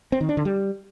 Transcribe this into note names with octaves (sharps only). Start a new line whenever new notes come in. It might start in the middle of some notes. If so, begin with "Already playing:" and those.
C4
D#3
D4
D3
G3